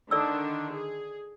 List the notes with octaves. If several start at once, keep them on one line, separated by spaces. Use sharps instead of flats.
D3 D#3 D4 A4 D5 E6
G#4